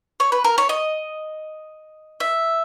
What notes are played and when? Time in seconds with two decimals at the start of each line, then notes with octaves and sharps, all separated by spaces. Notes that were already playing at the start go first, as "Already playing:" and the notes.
0.20 C#5
0.32 B4
0.44 A#4
0.58 C#5
0.69 D#5
2.20 E5